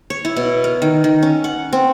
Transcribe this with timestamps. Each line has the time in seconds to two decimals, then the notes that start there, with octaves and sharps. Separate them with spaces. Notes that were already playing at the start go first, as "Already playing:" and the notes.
0.10 C#5
0.25 E4
0.36 B2
0.64 A#4
0.82 D#3
1.04 D#3
1.23 C#4
1.44 F#5
1.73 C4